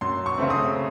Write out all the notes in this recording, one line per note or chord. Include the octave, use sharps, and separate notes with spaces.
F#2 C6
C#6
C#3 A3 C4
D#6